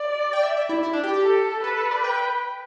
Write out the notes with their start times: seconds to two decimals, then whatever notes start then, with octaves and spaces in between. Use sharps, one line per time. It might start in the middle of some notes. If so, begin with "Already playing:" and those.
Already playing: D5
0.33 G5
0.43 E5
0.57 E5
0.69 E4
0.83 E4
0.93 D4
1.03 G4
1.14 G4
1.23 A4
1.64 A4 B4
1.78 A4
1.91 D5
2.04 G5